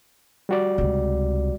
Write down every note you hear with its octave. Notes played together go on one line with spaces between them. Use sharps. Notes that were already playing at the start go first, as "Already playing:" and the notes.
G3 F#4 D5
C#2 C3